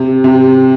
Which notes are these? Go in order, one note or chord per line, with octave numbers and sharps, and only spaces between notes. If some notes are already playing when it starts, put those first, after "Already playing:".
Already playing: C3
C3